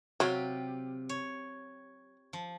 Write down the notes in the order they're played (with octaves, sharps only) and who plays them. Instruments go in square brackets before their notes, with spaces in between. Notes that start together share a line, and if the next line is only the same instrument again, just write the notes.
[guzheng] C3 F4 G4 [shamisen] F#3
[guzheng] C#5
F3